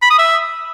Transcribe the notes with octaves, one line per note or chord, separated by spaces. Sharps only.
B5
D#6
E5